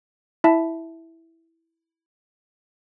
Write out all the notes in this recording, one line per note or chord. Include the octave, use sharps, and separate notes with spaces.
E4 E5 A5